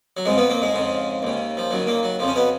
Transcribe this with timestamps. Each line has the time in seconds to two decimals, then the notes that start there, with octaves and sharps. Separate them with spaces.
0.17 F#3
0.25 F2 G#2 C#3 G#3
0.37 B2 B3
0.49 A#2 A#3
0.62 G#2 G#3
0.74 F2 C#3
1.23 D#2 C#3
1.57 F3
1.71 D#2 C#3 F#3
1.87 A#2 A#3
2.03 F#3
2.19 F2 C#3 F3
2.28 C#4
2.36 B2 B3